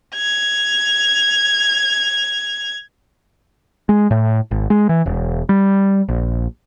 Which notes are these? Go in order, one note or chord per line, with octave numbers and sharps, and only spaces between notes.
G#6 F7
G#3
A2
G#1
G#3
E3
E1
G3
A#1